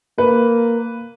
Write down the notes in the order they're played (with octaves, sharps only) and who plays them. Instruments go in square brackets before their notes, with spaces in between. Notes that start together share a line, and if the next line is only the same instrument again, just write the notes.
[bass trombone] A#3 [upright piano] B4